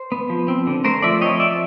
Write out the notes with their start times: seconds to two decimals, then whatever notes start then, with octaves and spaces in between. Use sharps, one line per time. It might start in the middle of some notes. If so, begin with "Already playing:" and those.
Already playing: C5
0.12 B3
0.30 F3
0.48 C4
0.67 D3
0.84 A3 A#4 C5
1.02 F3 D5 E5
1.21 C4 C#5 D#5
1.40 F3 D5 E5